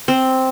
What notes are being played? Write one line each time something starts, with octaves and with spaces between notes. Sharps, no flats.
C4